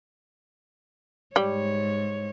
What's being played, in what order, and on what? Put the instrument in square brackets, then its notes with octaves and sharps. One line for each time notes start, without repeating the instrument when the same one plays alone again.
[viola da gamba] G#2 C#5 [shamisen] G3